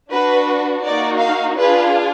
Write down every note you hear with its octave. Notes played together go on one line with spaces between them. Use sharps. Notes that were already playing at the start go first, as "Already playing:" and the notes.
D4 F#4 B4
A#3 D#4 F#4 D5
F5
D4 F4 G#4 B4